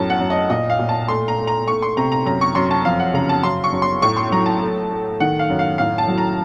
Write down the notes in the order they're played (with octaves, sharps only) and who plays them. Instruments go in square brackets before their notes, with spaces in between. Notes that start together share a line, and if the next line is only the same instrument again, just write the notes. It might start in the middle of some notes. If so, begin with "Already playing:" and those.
Already playing: [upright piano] F#2 A2 A5
F#5
F#2
D#5
A#2 D#5
F5
A#2
A5
A3 C6
A#5
A3
A#5
A3 C#6
C6
C3 A#5
A#5
F#2 A#5
C#6
F#2 C6
A5
F2 F5
F#5
C#3 A#5
A5
F#2 C6
C#6
F#2
C6
A2 C#6
C6
F#3 A#5
A5
A3
A3
D#3 F#5
F5
F#2
F5
A2 F5
A5
F#3
A#5